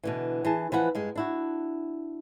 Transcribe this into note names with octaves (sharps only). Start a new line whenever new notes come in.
B2 D3 E3
E3 G#4 A5
E3 F3 B4 F#5
G2 G#3
D4 E4 F#4